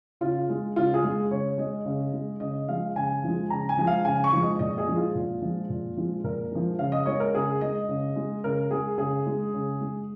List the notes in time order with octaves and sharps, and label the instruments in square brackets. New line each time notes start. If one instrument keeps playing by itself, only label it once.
[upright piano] C#3 F4
G#3
C#3 F4
G#4
G#3
C#3 C#5
G#3 D#5
C#3
G#3
C#3 D#5
F3 G#3 F5
C#3 G#5
F3 G#3
C#3 A#5
G#5
F3 G#3
F5
C#3 G#5
C#6
F3 G#3
D#5
A#2 D#5
G#4
F3 G#3
F4
A#2
F3 G#3
A#2
F3 G#3
A#2 A#4
F3 G#3
C#3 F5
D#5
G#3 C#5
A#4
C#3 G#4
G#3 D#5
C#3
G#3
C#3 A#4
G#3 G#4
C#3 G#4
G#3
C#3
G#3